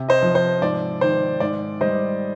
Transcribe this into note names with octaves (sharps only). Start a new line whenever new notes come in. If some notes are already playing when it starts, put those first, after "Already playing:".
Already playing: C3
C5 D#5
F3
C5
G#2 D5
D#3 C5
G#2 D5
G3 C5 D#5